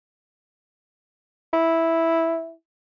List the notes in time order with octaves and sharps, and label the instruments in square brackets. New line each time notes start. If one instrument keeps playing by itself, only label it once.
[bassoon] E4